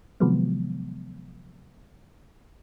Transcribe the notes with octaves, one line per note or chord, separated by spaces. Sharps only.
C3 D#3 F3 F#3 G#3 B3